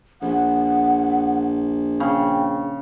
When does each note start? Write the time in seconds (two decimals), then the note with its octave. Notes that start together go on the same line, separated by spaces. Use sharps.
0.22 A#1 F#5
2.00 C#3 G5